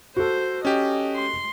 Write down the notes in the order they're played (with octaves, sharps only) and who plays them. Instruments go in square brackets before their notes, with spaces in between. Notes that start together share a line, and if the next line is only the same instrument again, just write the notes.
[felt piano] F#4 A4 [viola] C5
[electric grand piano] C#4 G4 [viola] D#5
[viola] C6